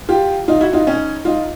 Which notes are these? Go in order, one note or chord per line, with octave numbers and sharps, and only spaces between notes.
F4 G4
D#4 F4
E4 F#4
D#4 F4
C#4 D#4
D#4 F4